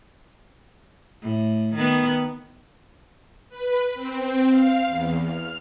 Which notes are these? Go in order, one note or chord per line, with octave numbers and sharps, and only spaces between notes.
A2
D#3 B3
B4
C4
F5
E2
F6